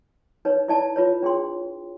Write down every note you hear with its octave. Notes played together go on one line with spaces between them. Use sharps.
D#4 B4 C#5
E4 D5 A5
F4 B4 C#5
D4 G#4 G5 C6